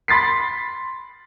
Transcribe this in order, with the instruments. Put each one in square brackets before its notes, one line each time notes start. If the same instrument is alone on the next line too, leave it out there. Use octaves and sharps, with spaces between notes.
[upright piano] B5 C6 A6 B6 C7